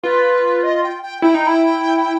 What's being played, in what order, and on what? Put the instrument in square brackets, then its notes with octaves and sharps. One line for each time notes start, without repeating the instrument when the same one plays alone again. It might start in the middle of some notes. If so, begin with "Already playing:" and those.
[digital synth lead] F4 [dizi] B4
[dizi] D#5
G5
G5
[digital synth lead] E4 [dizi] G5
[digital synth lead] D#4
E4